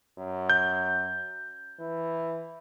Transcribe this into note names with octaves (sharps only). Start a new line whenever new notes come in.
F#2
G6
E3